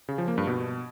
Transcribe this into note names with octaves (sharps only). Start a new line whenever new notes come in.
C#3
F3
A#3
G2
B2